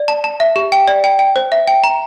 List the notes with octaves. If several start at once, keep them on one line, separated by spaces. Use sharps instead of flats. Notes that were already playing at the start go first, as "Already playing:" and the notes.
Already playing: D5
A5
A5
E5
G4
G5
D5
G5
G5
C5
E5
G5
A#5